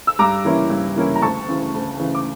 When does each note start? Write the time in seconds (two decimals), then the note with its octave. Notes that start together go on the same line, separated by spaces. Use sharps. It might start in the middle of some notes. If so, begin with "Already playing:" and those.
0.07 E6
0.19 G2 A#5 D6
0.45 E3 A#3 C#4 E4
0.70 G2
0.96 E3 A#3 C#4 E4
1.15 A#5
1.22 D2 A5 C#6
1.48 C#3 E3
1.74 D2
1.99 C#3 E3
2.15 D6